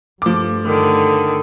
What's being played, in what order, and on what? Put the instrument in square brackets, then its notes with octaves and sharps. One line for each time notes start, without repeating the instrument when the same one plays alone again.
[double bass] G2 A3 [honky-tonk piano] F3 D6
[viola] D3 D#3